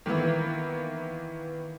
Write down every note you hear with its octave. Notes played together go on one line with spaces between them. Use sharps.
D#3 E3 A#3 B3 E4